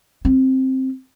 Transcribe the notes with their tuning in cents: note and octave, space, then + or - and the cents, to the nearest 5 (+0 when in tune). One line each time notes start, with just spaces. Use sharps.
C4 +5